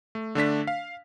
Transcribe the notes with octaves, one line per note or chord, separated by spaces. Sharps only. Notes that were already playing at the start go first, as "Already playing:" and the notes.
A3
D3 A3 D4 B6
F5